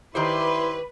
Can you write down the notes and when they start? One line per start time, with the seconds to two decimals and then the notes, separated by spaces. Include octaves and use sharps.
0.15 D#3 E4 G4 B4 C5 D5 E5 C6